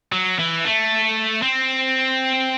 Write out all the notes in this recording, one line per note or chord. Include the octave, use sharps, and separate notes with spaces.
F#3
E3
A3
C4